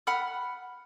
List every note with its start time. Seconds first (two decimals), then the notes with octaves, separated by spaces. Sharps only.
0.07 F#5 B5 F6